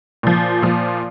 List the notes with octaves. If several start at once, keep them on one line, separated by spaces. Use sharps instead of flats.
A#2 F3
A#2 F3